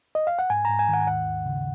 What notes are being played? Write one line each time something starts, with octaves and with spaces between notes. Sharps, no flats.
D#5
F5
F#5
G#2 G#5
G#2 A#5
G#5
D#3
F#5
D#2 F#5
D#2
C#3